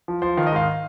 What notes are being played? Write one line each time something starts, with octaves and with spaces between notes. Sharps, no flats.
F3
F3 C5
D#3 F5
D#5
G#2 F5